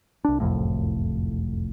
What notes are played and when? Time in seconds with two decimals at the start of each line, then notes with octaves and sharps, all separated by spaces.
0.25 C2 D4
0.40 F#1 C2 F2 A2